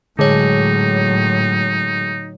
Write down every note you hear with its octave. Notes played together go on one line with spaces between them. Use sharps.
A2 D3 F#3 G#3 D#4 C#5